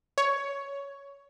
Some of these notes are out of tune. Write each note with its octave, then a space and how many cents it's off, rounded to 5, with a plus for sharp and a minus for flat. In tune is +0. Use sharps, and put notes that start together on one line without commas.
C#5 +10